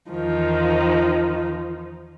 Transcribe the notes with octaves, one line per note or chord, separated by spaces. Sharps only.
E2 D#3 F3